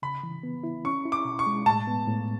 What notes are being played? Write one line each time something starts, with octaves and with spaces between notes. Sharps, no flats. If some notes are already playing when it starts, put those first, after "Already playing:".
C#3 B5
E3
B3
E4
C#4 C#6
E4
D6
B2
C#6
G#3
A2 A5
B3
A2